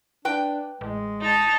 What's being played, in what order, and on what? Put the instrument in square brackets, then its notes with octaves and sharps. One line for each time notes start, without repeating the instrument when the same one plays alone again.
[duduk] D4 [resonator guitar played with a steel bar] B4 G5
[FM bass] A1 [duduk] G#3
[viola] D#4 A5